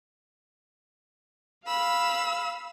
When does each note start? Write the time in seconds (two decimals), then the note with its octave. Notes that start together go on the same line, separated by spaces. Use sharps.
1.67 F5 B5 E6